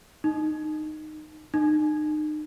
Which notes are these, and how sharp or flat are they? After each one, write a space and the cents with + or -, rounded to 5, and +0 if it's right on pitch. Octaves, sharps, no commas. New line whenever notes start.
D#4 -15
D#4 -35